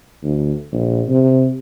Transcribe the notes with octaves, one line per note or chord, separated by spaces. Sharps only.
D2
A#1
C3